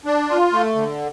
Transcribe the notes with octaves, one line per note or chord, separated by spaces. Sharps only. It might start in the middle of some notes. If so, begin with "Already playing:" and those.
D4
F4
A3
D3